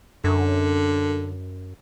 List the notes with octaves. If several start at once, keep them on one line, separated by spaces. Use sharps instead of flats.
F#2 D3